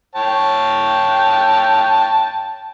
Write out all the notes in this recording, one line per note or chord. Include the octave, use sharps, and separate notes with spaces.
C#5 G5 A5